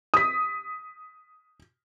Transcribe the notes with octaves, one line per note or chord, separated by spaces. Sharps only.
D#6 B6